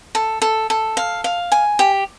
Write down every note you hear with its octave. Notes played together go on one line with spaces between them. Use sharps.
A4
A4
A4
F5
F5
G#5
G4